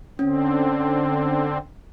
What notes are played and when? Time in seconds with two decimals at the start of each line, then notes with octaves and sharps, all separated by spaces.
0.19 D3 C4 C#4